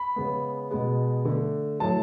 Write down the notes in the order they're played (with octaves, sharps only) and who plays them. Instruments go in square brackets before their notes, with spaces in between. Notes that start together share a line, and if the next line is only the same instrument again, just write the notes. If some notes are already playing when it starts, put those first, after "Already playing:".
Already playing: [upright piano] B5
C#3 G#3 B3
B2 G#3 B3
D3 A3
A2 F#3 A3 A5